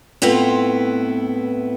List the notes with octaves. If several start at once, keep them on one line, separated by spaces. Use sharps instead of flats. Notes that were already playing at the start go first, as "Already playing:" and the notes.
A2 B3 C4 E4 F4 B4